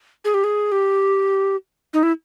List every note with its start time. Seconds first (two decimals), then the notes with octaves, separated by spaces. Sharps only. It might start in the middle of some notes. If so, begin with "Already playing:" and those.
0.25 G#4
0.34 G4
0.44 G#4
0.72 G4
1.94 D#4
2.03 E4